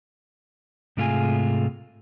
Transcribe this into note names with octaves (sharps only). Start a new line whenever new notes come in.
G#2 C3 A3 F4 G#4 G#5